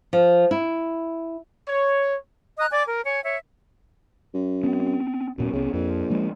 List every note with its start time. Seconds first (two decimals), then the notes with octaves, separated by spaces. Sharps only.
0.13 F3
0.51 E4
1.67 C#5
2.58 D#5 A#5 D#6 F#6
2.71 D5 G#5 D6
2.87 A#4
3.06 C#5 G#5
3.25 C#5 E5
4.34 F#2
4.63 B3 C4
5.38 D#1 F#2 A#2 B3
5.53 C2 C#3 B3
5.73 A#1 F2
6.10 F3 G#3 A#3